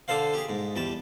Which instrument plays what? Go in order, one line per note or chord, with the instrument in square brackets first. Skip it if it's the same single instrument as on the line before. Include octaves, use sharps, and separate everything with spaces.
[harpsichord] D3 D4 A4 C5 F5
G4 G#4
G#2
E2 G3 A5